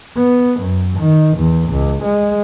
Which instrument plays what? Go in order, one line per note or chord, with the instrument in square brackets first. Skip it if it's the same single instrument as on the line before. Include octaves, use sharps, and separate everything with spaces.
[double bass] B3
F#2
D#3
E2
C#2
G#3